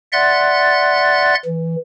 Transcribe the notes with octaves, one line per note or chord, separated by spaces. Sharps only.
D5 E5 F#5 C6 F#6 A6
E3